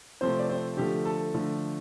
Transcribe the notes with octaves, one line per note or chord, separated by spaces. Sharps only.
C3 F3 A3 C4 C5
D5
C4 C5
D3 F3 A3 G4
A4
D3 F3 A3